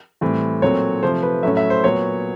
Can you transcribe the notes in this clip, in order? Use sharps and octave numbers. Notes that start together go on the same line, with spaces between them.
A2 E3 G3 C4
A#2 F#3 A3 C4 C#5
C3 F3 A3 C5
B4
A2 F#3 A3 C#4 E5
E5
C5
A#2 F#3 B3 C#5